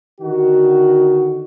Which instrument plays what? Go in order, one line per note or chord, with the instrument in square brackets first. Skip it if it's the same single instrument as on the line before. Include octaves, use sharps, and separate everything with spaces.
[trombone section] D3 D#3 F#4